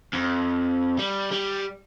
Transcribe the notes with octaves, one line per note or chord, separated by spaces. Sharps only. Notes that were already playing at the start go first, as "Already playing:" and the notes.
F2
G3
G3